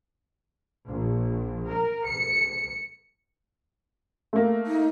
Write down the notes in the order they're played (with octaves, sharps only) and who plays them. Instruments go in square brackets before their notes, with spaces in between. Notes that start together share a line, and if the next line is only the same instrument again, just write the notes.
[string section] A#1
A#4
C#7
[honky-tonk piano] A3 A#3
[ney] D#4